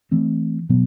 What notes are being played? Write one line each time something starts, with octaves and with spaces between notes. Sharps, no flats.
E3 A3 C4
B2 F#3 B3